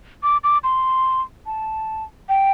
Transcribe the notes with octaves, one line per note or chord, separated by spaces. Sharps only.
D6
D6
C6
A5
G5